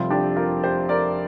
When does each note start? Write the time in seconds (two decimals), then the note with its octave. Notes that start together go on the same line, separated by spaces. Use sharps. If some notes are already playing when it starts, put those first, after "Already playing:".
Already playing: F1 F2 C3 G3 C4 F4
0.10 D4 G4
0.36 F4 A#4
0.63 G4 C5
0.89 A#4 D5